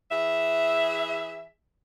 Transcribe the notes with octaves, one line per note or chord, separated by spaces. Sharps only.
E3 G#4 E5